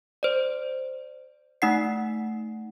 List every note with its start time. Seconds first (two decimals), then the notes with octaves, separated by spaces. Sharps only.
0.23 C5 D5
1.62 A3 D#4 F#5 C7